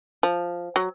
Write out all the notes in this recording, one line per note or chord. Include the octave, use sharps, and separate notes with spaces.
F3
F#3